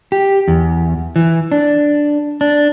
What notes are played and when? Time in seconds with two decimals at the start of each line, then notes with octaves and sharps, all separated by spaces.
0.12 G4
0.48 E2
1.16 E3
1.52 D4
2.41 D4